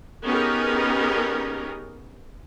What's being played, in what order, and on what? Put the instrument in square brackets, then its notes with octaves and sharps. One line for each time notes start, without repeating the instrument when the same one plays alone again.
[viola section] B3 C#4 D#4 G4 G#4 A#4